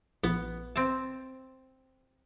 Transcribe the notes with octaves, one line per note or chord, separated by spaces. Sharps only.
A#1 B3
C4 A5